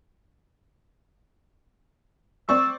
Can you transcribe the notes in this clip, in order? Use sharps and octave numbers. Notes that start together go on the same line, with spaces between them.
C4 D5 C#6 E6